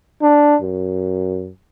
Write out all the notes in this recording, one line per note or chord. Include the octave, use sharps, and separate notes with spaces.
D4
F#2